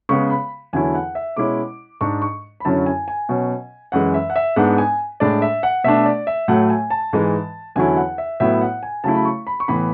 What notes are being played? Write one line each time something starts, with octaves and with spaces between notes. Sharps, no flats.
C#3 G#3 B3 C#6
B5
E2 D3 F#3 C#4 E4 G#5
F#5
E5
B2 G#3 C#4 E4 D6
G#2 G#3 D4 C#6
C#6
B5
F#2 D3 F#3 C#4 E4 A5
G#5
G#5
B2 F#3 C#4
F#2 E3 G#3 F#5
E5
F#5
E5
G#2 G#3 B3 D4 F#5
G#5
A2 G#3 D4 D5
E5
F#5
B2 A3 D4 E5
D5
E5
A2 F#3 A3 F#5
G#5
A5
G#2 E3 G#3
E2 D3 F#3 C#4 E4 G#5
F#5
E5
A2 F#3 B3 E4 E5
F#5
G#5
C#3 F#3 A3 E4 A5
B5
C#6
B5
C#6
A2 E3 B3 B5